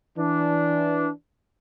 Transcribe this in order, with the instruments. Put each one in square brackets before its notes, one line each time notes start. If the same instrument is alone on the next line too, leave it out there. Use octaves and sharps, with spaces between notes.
[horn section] E3 D4